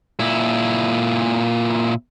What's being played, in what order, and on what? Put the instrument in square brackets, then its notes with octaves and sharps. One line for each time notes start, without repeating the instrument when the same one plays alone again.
[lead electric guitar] A#2 E4